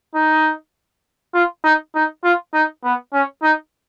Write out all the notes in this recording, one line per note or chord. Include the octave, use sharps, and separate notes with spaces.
D#4
F4
D#4
D#4
F4
D#4
B3
C#4
D#4